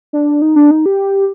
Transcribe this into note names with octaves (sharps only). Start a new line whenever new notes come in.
D4
D#4
D4
D#4
G4